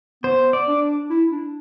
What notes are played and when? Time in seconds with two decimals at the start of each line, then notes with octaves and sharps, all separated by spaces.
0.23 B3 C5
0.53 D5
0.67 D4
1.10 E4
1.32 D4